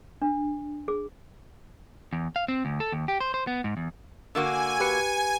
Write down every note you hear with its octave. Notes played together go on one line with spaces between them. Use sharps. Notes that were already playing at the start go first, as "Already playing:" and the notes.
D4
G#4
E2
F5
C4
D2
A4
D#2
G4
C5
C5
B3
G#2
E2
D3 A#3 F#4 G#5
G4 B4 C#7